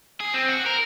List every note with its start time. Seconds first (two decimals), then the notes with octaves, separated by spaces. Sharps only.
0.20 G#4
0.34 C4
0.48 F#4
0.66 A#4